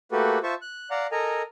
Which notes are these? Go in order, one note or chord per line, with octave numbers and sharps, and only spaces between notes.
A3 A#3 F#4 G4 A4 B4
F4 C5 E5 A5 C#6
F#6
D5 F5 F#5 A#5
A4 A#4 D#5 G#5 A#5